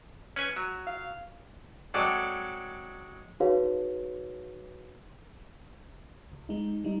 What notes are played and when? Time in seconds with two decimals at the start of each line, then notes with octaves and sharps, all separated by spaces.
0.36 C#4 B4 G#5
0.56 F#3
0.87 F5
1.94 F#3 G#3 C4 A4 D5
3.40 D#4 F#4 G#4 B4 C#5 F5
6.32 C#2
6.49 G#3 D#4
6.84 G3 D#4